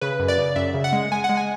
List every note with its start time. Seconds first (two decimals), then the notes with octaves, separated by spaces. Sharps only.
0.01 C#3 B4
0.19 F#2
0.28 D5
0.38 C#3
0.56 F#2 E5
0.74 C#3
0.84 F#5
0.93 G#3
1.12 G#3 G#5
1.24 F#5
1.29 G#3
1.37 G#5